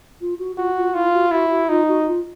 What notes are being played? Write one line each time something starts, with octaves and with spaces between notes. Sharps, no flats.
F4
F#4
F4 F#4
F4
E4 F4
F#4
E4 F#4
F#4
D#4 F4
F#4
F4